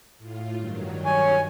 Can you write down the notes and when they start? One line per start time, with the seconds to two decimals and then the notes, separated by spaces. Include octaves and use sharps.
0.17 A2 F4
0.55 G2 D#3 F#3
1.05 C#5 G#5